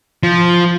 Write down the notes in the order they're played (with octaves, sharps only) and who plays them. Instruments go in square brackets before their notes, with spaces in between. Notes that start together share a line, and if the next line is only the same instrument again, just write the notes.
[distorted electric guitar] F3